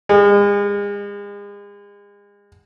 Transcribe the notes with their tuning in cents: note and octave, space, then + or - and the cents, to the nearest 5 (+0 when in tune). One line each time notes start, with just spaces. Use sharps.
G#3 -40